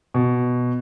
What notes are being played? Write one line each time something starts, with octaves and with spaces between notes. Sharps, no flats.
B2